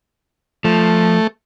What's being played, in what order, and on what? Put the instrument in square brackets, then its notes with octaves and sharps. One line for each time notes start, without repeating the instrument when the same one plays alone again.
[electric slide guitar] F3 [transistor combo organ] A3